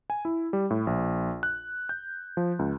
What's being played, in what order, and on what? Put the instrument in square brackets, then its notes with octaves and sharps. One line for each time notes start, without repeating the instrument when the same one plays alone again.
[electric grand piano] G#5
E4
G3
A2
A#1
F#6
G6
F3
C#2